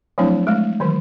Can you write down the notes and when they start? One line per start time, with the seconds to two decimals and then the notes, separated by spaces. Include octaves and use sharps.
0.18 F3 F#3 A3 C4 D4 E4
0.47 G#3 A3
0.80 D#3 E3 F#3